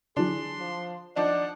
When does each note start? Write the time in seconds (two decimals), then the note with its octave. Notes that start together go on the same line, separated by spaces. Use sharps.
0.17 D3 E3 F#3 D4 G#4 C6
0.59 F3
1.16 F3 D4 D#4 D5 F#5